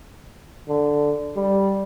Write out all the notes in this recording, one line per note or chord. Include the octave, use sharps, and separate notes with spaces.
D3
G3